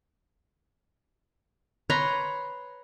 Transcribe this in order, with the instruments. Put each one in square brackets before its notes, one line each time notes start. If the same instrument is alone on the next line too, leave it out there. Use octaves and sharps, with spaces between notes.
[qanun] B4 C#5 A#5 C6